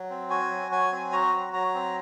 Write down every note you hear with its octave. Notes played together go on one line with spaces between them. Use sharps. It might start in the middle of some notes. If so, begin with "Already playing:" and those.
Already playing: F#3
C4
F#4 G#5
F#3
F#3 G#5
C4
F#4 A#5
F#3
F#3 A#5
C4